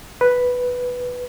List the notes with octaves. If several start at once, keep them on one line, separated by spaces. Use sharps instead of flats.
B4